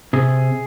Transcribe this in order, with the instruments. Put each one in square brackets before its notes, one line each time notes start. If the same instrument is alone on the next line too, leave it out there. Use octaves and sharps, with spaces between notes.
[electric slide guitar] C3 G#4